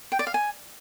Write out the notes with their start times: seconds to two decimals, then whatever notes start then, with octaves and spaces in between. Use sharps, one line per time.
0.12 G5
0.19 D5
0.27 F5
0.34 G#5